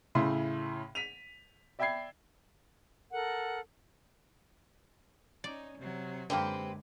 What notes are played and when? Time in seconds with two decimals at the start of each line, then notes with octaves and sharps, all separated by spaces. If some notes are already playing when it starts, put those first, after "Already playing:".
0.15 A2 C#3 E4 C6
0.95 B6 D#7 F7
1.79 D5 E5 G5 B5 G#6 C7
3.11 A4 A#4 F#5
5.44 C#4 D#4 D5
5.78 C3 F#3
6.30 F#2 D3 G#3 A#3 C4 G4 B4